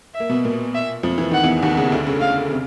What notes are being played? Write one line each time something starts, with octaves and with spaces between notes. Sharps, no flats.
E5
A#3
B2 B3
A#2 A#3
E5
F2 F3
E3
D#3 F#5
E2 E3
D#2 D#3 F#5
C#3
D2 D3
C#3
C#3 F5
C3